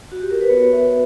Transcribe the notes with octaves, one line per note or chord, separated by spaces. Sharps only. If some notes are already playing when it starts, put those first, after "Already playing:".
F#4
G4
A#4
B4
B3 F#4 C#5
E5